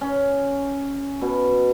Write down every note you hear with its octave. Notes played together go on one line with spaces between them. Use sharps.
C#4
B2